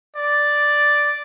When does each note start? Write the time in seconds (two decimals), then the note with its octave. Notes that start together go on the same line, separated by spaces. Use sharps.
0.16 D5